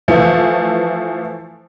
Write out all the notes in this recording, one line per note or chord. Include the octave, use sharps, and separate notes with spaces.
E3 F3 A3